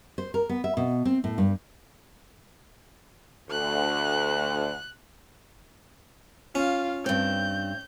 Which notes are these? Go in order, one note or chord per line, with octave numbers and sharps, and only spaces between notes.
C5
A#4
B3
E5
B2
C4
A2
G2
D2 F#6
C#4 F4 F5
G2 C4 G6